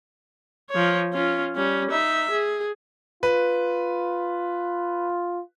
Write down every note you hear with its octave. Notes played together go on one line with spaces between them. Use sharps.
F3 C#5
C#4 F4
G3 C#4
D#4 E5
G#4
F4 B4